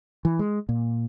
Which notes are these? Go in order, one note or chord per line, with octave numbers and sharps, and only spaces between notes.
E3
G#3
A#2